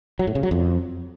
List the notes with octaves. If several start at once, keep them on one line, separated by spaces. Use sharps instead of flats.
F#3
A2
C#3
F#3
F2